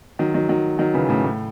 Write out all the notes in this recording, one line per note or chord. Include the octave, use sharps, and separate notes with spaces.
D#3 F#3
D#3 F#3
D#3 F#3
D#3 F#3
C#3 E3
A2 C#3
A2